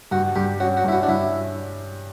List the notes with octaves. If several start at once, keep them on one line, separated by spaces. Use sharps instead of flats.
G2 F#4
G2 G4
C#4 F#4
F#4
G2 E4
F#4
D4
G2 E4